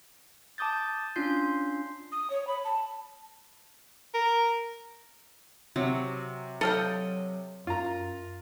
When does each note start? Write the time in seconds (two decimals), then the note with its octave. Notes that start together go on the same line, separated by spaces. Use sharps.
0.58 A5 D6 D#6 G6 A6
1.16 C#4 D4 F4 C6 G6 C7
2.12 D#6
2.30 C#5
2.47 B5
2.65 A5
4.14 A#4
5.76 C3 F#3
6.61 F#3 A4 D#5 F5 G5
7.67 F#2 F4 A#5